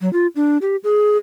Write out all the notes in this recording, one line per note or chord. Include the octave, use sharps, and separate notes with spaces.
F#3
F4
D4
G4
G#4